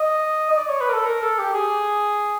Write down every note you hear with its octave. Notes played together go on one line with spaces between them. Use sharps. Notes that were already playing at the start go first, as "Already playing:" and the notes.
Already playing: D#5
D#5
D5
C#5
B4
A#4
A4
A#4
A4
G4
G#4